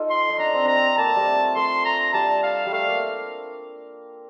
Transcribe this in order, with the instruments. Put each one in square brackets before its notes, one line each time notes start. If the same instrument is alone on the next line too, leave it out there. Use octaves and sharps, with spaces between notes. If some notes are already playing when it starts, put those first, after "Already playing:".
Already playing: [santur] D#4 F4 A4
[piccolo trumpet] C6
[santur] D#4
[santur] D4 [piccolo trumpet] A#5
[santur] C4
[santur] D4 [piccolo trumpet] A#5
[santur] C4
[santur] A#3 [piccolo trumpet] A5
[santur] A3
G3
A3
[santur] A3 [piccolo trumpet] C6
[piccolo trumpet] A#5
[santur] G3 [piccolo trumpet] A5
[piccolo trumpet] F5
[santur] G3
[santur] A3 [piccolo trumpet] F5
[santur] A#3